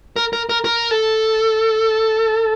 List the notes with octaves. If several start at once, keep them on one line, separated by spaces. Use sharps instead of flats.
A#4
A#4
A#4
A#4
A4